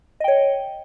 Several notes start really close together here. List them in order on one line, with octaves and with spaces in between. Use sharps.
D#5 G5 C#5